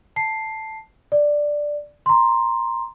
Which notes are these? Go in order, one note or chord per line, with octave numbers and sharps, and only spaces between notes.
A5 C7
D5
A#5 C6